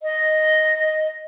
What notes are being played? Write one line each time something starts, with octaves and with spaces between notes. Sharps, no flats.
D#5